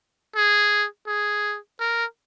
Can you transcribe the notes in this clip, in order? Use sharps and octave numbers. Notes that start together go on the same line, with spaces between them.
G#4
G#4
A#4